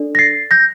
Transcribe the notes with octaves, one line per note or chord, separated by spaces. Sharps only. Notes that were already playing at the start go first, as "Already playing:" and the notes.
Already playing: D4 A4 D5
A#6
A6 C7
G6 A#6